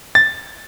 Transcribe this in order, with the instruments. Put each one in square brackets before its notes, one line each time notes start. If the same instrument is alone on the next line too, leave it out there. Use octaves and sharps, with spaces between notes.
[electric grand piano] A6